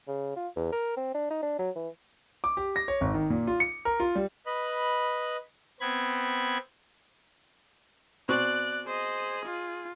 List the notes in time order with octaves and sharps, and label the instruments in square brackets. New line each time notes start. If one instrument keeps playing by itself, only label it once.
[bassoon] C#3
F4
E2
A#4
C4
D4
D#4
D4
F#3
E3
[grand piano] D6
G4
A#6
C#5
G#1
D#3
A#2
F4
C#7
A#4
F4
G3
[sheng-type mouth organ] B4 D#5 B5
[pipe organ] B3 C4 B5 G#6
[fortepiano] B2 C4 C#6 [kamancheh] D5 F#6
[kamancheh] G#4 [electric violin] C5 D#5
[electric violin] F4